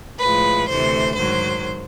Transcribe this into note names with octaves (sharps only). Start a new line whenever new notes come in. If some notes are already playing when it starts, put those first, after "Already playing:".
A2 F3 G#3 B4
D2 C3 E3 A3 C5
G#2 D#3 F#3 C5